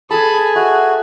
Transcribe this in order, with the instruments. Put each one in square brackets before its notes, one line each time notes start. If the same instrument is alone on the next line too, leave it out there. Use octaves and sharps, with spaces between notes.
[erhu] G#4 [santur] A4 B4 [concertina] A5 B5
[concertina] F#4 [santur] E5